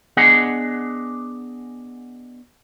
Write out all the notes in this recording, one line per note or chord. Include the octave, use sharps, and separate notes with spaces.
B3 D4 G#4 D#5 F#5 G#5